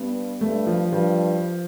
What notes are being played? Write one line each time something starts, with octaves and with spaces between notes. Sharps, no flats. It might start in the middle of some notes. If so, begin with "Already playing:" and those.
Already playing: G2 B3
G2 A3
F3
G2 F3